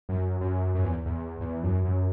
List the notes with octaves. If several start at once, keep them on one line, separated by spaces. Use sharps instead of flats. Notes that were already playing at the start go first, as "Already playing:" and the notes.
F#2
F#2
F#2
E2
E2
E2
F#2
F#2